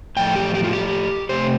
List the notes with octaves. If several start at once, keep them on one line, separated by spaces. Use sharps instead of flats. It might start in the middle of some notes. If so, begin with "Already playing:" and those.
A2 F3 A3 G5
G4
G4
F4
G4
C3 A3 C4 C5